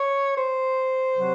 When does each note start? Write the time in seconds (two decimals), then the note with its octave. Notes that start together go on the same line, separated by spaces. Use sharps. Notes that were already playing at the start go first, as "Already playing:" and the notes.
Already playing: C#5
0.37 C5
1.18 C3 F#3